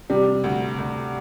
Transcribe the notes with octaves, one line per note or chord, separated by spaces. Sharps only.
C3 G3
D2
D2